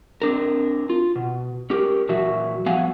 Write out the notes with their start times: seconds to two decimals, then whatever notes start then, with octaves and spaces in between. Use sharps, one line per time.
0.22 C4 D4 A#4
0.90 F4
1.16 B2
1.70 C#4 G4 A#4
2.09 A#2 E3 F#3 F#4 E5
2.66 F3 G3 B3 F#4 F5 G#5